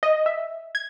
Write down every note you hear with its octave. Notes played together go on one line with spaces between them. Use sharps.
D#5
E5
G#6